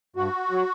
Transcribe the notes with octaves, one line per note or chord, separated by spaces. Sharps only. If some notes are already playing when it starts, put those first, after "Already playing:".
G2 F#4
F#3